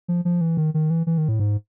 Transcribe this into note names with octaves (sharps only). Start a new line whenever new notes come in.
F3
F3
E3
D#3
D#3
E3
E3
D#3
A2
G#2